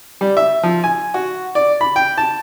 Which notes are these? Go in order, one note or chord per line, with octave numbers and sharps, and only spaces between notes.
G3
E5
F3
G#5
F#4
D5
B5
G5
A5